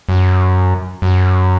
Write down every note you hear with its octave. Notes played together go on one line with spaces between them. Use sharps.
F#2
F#2